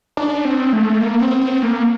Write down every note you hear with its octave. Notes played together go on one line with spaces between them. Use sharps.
D4
C4
A3
A#3
C4
C4
A#3